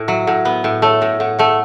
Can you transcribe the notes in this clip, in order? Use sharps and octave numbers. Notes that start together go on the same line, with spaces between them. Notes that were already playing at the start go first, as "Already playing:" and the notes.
Already playing: A2
F#3 E5
A2 F#5
B3 F#5
A2 E5
A3 C#5
A2 E5
A2 F#5
A3 F#5